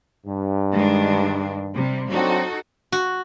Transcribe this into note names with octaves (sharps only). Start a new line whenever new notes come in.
G2
D#3 G#3 D4
C3 G3
F#3 C4 D4 D#4 F#4 A4
F#4